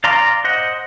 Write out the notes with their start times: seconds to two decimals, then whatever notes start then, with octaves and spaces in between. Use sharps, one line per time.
0.04 D5 F5 A#5 C6 D6
0.44 C5 D#5 F#5